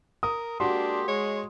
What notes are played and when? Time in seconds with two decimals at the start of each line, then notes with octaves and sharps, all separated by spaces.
0.23 A#4 D#6
0.60 G#3 A#3 D4 F#4 G4 C6
1.08 G#3 C#5